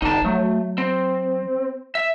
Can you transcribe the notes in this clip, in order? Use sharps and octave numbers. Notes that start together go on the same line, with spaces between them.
G1 D#4 A5
F#3 A3
C4
E5